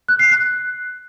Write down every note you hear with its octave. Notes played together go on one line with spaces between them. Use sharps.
F#6
C7
F#6